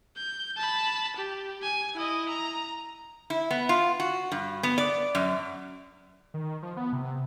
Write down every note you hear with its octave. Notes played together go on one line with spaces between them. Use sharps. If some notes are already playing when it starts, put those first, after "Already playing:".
G6
A5 B5
G4
G#5
E4 D#5
A#5
E4
B3
F4
F#4
G2
B3
D5
F#2
D#3
F3
B3
C3